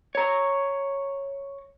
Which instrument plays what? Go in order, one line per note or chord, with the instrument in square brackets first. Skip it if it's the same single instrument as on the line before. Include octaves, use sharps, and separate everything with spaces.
[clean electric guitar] C#5 A#5